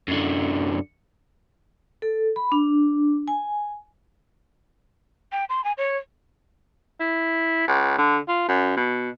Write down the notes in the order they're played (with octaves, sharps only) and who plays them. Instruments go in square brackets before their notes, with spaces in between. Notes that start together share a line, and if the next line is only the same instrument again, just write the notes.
[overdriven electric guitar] F#2 D3
[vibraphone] A4
B5
D4
G#5
[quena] G5
C6
G#5
C#5
[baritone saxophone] E4
C#2
D3
F4
F#2
B2